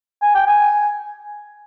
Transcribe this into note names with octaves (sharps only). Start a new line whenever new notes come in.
G#5
G5
G#5